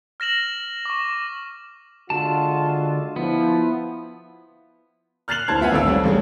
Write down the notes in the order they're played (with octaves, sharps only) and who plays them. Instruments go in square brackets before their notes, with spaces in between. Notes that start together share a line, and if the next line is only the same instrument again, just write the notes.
[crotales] F6 A#6 E7 F#7
C#6 D6
[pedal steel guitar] D3 A5 [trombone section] G#3 F4 F#4
[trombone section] F3 E4 [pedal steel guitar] B3
[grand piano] F6 F#6 A6 C7 F7 F#7
D2 E4 C5 A5 G#6
B3 F4 E5 F#5 G#5
G#1 D2 C4 A4 F5 E6
F#3 G3 C4 C#4
A1 C#3 G3 A3 G#4